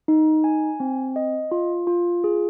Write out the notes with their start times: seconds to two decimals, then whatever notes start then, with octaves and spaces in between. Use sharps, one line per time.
0.08 D#4
0.44 G#5
0.80 C4
1.16 D#5
1.51 F4
1.87 F4
2.24 G#4